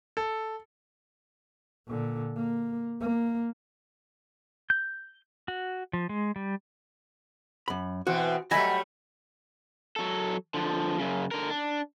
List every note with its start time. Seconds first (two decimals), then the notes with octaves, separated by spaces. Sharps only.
0.17 A4
1.88 A#2 D3
2.37 A#3
3.01 A#3
4.70 G6
5.48 F#4
5.93 F3
6.09 G#3
6.36 G3
7.68 F#2 B5
8.07 B2 E3 C4 F#4
8.51 F#3 G3 A3 D#5 E5 G#5 B5
9.96 F#3 A4
10.54 D3 F3
10.99 F#2 C#3
11.31 D3 A#4
11.50 D4